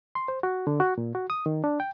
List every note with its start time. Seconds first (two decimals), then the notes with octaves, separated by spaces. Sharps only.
0.15 C6
0.28 C5
0.43 F#4
0.67 D3
0.80 F#4
0.98 A#2
1.15 F#4
1.30 D#6
1.46 D#3
1.64 D4
1.80 G5